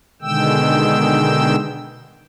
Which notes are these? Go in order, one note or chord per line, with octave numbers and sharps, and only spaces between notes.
B2 D3 D#3 G#3 G5 E6